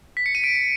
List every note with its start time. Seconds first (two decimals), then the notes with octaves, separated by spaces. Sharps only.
0.17 B6
0.26 C#7
0.35 D#7
0.44 D7